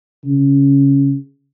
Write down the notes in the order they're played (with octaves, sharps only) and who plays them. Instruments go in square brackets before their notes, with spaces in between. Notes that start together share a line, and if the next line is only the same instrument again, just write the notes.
[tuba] C#3